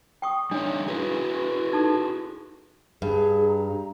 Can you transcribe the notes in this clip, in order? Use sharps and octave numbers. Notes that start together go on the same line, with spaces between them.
G5 C#6 D#6
G3 D4 D#4 C#5
E4 F#4 G#4 B4
D#4 A4
G2 G#4
A#5